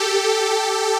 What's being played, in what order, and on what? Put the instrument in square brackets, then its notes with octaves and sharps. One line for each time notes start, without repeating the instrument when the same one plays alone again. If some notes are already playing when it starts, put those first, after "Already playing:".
Already playing: [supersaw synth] G4 A4